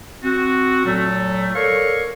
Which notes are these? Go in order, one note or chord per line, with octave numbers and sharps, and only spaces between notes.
C4 F#4
A#2 F#3 A3
A4 A#4 C#5 D5 F5 C#6